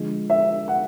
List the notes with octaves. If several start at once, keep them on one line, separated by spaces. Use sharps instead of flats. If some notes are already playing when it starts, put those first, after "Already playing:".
Already playing: D3 F3 G#3
E5
F#5